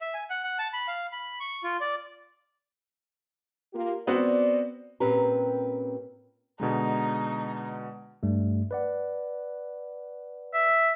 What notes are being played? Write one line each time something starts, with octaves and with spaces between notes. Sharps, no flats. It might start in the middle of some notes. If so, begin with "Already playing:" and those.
E5
G#5
F#5
F#5
A5
B5
F5
B5
C#6
F4
D5
A#3 F4 G4
B3 C4 F#4 D5
A#2 C4 C#4 G4 B4 A#5
B2 D3 G#3 D#4
G2 G3 A3
B4 D5 F#5
E5